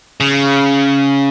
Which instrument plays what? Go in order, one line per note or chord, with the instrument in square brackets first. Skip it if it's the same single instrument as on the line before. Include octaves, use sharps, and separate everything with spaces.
[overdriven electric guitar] C#3